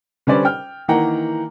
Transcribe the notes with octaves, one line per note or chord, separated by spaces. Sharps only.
D3 G3 C#4 B4 C5 D5
G5 F6
D#3 E3 A#3 F#5 G5 A#5